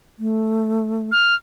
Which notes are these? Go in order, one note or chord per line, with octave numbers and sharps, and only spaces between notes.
A3
F6